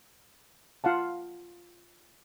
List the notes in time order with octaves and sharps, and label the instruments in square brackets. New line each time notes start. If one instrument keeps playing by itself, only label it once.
[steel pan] F4 F5 F#5 A5